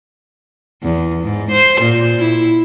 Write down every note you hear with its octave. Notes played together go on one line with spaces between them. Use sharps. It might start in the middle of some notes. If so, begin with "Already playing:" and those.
E2
G#2
C5
A#2
E4